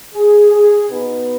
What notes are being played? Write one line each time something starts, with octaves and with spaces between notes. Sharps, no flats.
G#4
G#4
B2 B3 D#4 B4